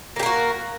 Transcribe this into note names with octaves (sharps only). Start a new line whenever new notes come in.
A#3 F#4 G4 A#4